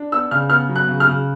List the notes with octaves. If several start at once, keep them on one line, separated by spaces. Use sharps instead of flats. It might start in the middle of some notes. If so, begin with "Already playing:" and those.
Already playing: D4
B3 E6
C#3 F6
B3 F6
F#3
F#6
C#3
F6
C#3